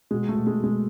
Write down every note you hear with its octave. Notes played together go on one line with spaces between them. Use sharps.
B2 G#3
A3
B2
G#3
B2 G#3